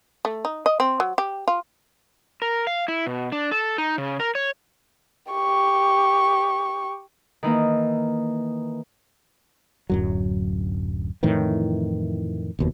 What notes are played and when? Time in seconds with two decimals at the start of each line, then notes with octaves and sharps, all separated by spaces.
0.25 A3
0.45 D#4
0.66 D#5
0.80 C4
1.00 F#3
1.18 G4
1.48 F4
2.42 A#4
2.67 F5
2.88 E4
3.06 B2
3.32 D4
3.51 A4
3.78 D#4
3.98 C#3
4.20 A#4
4.35 C#5
5.32 G4 C#6
7.43 D#3 E3 A#3
9.90 D1 F#2 F#3
11.23 F2 A2 D#3 E3
12.59 F1 D#2 B2